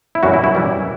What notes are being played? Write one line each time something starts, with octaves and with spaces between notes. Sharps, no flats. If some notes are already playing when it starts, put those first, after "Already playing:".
E4
F#2 E3 G3 F#4
E4
E4
F#2 E3 G3